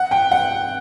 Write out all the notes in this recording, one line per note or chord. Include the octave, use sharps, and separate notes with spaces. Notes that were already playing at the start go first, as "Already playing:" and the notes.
Already playing: F#5
G5
F#5